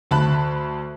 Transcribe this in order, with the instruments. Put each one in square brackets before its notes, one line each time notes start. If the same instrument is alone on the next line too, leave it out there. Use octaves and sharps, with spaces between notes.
[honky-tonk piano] D2 A5 B5 F#6